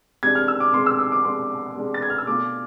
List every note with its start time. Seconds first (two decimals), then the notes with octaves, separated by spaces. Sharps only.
0.23 C3 G#3 D4 G#6
0.35 F6
0.48 E6
0.60 D6
0.73 C3 G#3 D4 C6
0.86 E6
0.99 E6
1.12 D6
1.25 C3 G#3 D4 C6
1.76 C3 G#3 D4
1.94 A6
2.02 G#6
2.10 F6
2.18 E6
2.27 B2 A3 D4 F4 D6